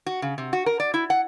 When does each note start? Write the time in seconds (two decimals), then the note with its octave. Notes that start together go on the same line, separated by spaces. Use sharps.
0.06 F#4
0.22 C#3
0.38 C3
0.53 F#4
0.66 A#4
0.80 D5
0.94 E4
1.10 F#5